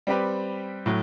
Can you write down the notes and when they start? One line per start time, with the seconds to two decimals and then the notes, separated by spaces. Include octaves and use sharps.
0.07 G3 C4 G4 B4
0.86 A2 F#3